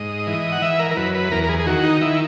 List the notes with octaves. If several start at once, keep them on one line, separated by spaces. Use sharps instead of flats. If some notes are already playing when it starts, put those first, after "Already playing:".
Already playing: G#2 D#5
E3
F#5
E3 E5
A#4
A#4
F#2 B4
B4
E2 A#4
A#4
G#4
G#4
D#3 F#4
D#4
D#3 E4